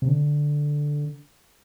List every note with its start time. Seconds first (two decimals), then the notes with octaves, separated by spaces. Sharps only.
0.02 C3
0.08 D3